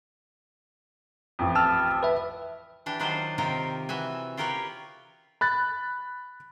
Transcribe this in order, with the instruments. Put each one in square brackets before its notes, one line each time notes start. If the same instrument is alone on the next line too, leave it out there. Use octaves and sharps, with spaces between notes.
[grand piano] A1 F2
[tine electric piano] A5 E6 F6
B4 E5
[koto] E3 D4 G4
D#3 F#3 D4 F4 C5
C3 D#3 C4 F4 G4 A#4
E3 F#4 E5 G#5
F4 G4 A#4 B4 C#5
[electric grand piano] B5 F#6 A6